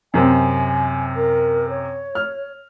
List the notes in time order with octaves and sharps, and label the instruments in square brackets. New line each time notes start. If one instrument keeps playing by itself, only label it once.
[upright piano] F#2 C3 C4 [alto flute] G#5
[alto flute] A#4
C#5
[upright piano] F6